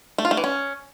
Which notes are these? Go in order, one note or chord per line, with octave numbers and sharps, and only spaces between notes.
A3
F4
A3
E3
C#4